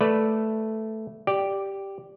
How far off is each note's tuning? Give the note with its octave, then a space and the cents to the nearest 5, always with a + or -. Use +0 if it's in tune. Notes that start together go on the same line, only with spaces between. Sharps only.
A3 +0 B4 +0 D5 +0
G4 +0 D5 +0